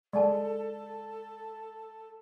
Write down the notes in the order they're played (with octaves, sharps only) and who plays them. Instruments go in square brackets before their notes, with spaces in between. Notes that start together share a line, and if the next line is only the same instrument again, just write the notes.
[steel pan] G#3 [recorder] A4 [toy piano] D5 A5